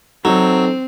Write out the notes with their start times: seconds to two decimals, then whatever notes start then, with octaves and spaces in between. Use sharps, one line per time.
0.25 F#3 C4 D#4 A4